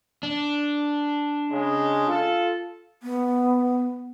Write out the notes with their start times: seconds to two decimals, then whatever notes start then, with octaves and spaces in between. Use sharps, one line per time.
0.23 D4
1.52 C#3 G#3
2.08 F4 A4
3.03 B3